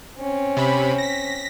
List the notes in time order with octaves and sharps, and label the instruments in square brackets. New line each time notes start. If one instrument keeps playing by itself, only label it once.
[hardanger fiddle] C4 C#4
[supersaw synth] C3 B5
A#6 B6